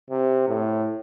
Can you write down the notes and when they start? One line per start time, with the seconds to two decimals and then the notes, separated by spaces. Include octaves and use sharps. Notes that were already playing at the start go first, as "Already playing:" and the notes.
0.10 C3
0.48 A2